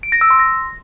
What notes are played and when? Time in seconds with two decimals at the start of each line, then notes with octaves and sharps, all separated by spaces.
0.03 D7
0.12 A#6
0.21 E6
0.30 C6
0.39 A#6